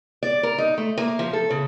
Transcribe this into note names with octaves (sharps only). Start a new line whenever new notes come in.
D5
A#4
D#4
A3
A#3
F3
A4
C#3